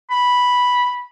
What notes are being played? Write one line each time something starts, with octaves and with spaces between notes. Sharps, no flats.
B5